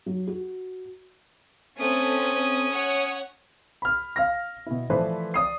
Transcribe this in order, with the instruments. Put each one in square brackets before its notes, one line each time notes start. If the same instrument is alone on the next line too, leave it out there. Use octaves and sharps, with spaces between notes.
[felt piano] F#3
F#4
[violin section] A3 C4 [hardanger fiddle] C#4 D#6
[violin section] C#5 F#5
[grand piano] B5 F6
F5 F6 A#6
B2 E4
E3 F3 A3 B4 C5 D5
D5 D#6 C7